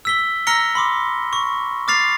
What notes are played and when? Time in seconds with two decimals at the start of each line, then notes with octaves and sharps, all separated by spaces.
0.05 E6 B6 G7
0.47 A#5 E6 F6 A#6 C#7 G7
0.75 B5 C6 D6
1.33 C#6
1.88 D6 F6 A6 C7 F7